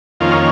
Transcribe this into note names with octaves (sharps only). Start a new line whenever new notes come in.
F2 D#3 A#3 C#4 F4